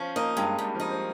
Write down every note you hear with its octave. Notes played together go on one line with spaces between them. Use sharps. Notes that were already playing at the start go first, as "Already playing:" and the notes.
Already playing: F3 C#4
A#3 D#4
G2 G#3
G2 G3
F3 D#4
C4